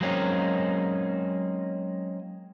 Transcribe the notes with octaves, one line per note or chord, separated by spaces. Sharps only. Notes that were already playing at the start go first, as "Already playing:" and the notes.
F#3 G#3 A#3 C4 C#4 D#4